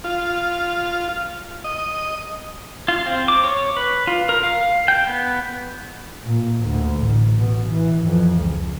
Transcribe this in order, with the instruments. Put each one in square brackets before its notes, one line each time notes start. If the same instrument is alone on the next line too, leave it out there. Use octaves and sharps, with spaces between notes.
[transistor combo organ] F4
D#5
[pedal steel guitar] F4
C4
D6
C#5
B4
F4
A#4
F5
G5
B3
[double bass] A#2
D2
A1
B2
E3
F2
C#2